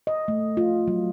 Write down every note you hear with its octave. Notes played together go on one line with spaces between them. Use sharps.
D#5
A3
F4
F#3